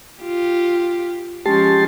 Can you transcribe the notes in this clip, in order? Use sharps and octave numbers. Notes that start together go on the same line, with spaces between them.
F4 G4
F3 G#3 C#4 G4 A5 C6